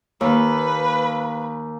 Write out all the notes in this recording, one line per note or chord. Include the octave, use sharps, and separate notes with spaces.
D#2 B4